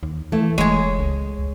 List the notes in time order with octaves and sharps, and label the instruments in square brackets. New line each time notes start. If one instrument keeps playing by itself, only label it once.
[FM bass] D#2
[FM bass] E3 [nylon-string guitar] A3 E4
[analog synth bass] F1 [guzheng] G#3 G#4 [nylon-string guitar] C#5
[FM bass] C#2
[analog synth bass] D2